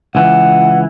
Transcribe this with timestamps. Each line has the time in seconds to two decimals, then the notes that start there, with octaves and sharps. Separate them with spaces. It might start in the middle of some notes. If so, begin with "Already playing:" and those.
0.15 C#2 E3 F#5